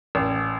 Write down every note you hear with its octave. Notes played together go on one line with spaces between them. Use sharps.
A1